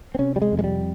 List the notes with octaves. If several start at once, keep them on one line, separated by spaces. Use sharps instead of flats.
C4
C3 C#4
G3
G#3
F2
G#3
G3